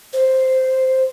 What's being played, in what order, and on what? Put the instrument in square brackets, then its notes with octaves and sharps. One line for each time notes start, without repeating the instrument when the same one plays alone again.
[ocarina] C5